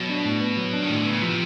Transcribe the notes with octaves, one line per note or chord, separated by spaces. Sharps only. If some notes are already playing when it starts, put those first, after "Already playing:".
Already playing: B2 F#3
D4
A2
B3
F#3
D4
D#3
A2
D3
C#3 B3
C3 F3